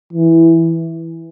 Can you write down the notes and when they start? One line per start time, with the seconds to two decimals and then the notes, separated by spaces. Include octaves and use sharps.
0.13 E3